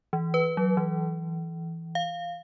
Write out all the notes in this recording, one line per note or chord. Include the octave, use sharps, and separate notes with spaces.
E3
B4
F#3
E3
F5